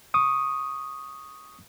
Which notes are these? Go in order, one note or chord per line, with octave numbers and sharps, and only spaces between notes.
C#6 D#6